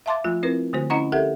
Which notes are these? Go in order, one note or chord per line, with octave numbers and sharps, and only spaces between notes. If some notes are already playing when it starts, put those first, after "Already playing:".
E5 F5 A5 C6 D6 A6
F3 A3 F4
C4 E4 A#4 B4
D3 A3 F#4 C5
C#4 E4 D#5 F#5 A#5 C#6
G4 A4 A#4 E5 F#5